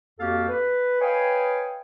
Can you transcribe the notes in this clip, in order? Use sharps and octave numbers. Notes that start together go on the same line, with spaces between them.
F2 A#3 F#4 G4 A4 F5
B4
B4 C#5 D#5 F5 G5 G#5